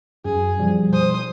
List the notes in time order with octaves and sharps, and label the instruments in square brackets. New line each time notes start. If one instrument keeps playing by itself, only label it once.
[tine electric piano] F#2 [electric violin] G#4
[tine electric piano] B2 F3 G3
[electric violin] C5 D#6